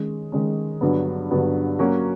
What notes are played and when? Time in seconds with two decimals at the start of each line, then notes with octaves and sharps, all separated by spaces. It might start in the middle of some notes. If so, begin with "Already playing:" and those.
Already playing: D#3 G#3 C#4
0.32 D#3 G#3 C#4
0.81 G2 D3 F#3 B3
1.31 G2 D3 F#3 B3
1.79 F#3 A#3 C#4 F#4